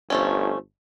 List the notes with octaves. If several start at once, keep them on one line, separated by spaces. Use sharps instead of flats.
G1 F3 A3 C#4